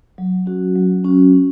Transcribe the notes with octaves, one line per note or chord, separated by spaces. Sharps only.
F#3
C#4 F#4
F#3
C#4 F#4
C#4